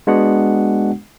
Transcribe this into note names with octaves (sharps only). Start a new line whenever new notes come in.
G#3 B3 D4 F#4 F#5